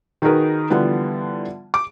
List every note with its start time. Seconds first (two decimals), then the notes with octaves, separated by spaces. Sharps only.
0.22 D#3 D#4 F#4 G#4 A#4 B4
0.70 D3 E3 F3 G3 B3
1.74 D6